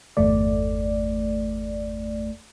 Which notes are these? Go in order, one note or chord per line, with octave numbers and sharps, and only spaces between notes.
G1 E2 A3 D5